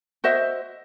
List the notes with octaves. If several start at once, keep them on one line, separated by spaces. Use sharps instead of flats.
F#4 C5 D#5 E5